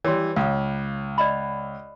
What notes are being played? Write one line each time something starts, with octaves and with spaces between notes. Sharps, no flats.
E3 G3 C#5 C6
C#2 F5 D#6
D5 D#5 B5